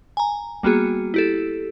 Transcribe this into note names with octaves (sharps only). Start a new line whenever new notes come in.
G#5 A#5
G3 A#3 B3 F#4 G#4
E4 G4 A4